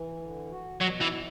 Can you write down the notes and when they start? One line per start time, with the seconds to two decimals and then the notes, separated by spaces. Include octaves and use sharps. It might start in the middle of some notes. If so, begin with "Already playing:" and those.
Already playing: E3
0.21 D3
0.51 F#4
0.80 B2 F#3
1.01 E3
1.11 E4